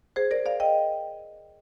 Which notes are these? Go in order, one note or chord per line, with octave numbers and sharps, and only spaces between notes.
G#4 C5
A#4 D5
D5 F5
D#5 G5